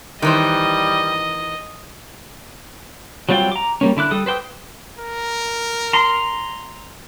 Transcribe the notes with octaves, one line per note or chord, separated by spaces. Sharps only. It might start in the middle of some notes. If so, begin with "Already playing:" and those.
D#3 E3 G3 C5 D#5
F#3 G3 C4 F4 G5
A#5 D6
G3 G#3 A#3 C#4
D3 E4 D6 F#6
G3 A4 D#6
B4 C5 G5 D6 D#6
A#4
A#5 C6